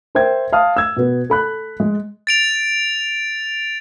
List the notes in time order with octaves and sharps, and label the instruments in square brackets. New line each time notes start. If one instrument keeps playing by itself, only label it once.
[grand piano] A#4 C5 E5 G5 G#6
F5 A5 D#6 F6
E6 G#6
B2 B3
A4 B5 F#6
G#3
[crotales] A6 D7 F7